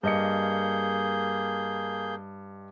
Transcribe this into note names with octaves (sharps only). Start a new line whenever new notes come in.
G2 A#3 G#4 D#5 G6 C#7